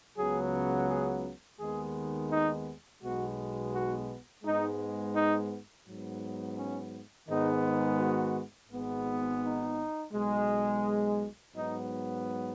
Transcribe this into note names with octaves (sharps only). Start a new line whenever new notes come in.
C#2 C#3 F#3 B3 G#4
G#4
D#2 D#3 G#3 B3 G#4
D#4
B1 B2 G#3 B3 F#4
F#4
G#2 G#3 B3 D#4
D#4
G#2 F#3 B3
C#4
G#2 D#3 G#3 B3 D#4
F#4
G#1 G#2 G#3 B3
D#4
B1 B2 G#3
G#2 F#3 B3 D#4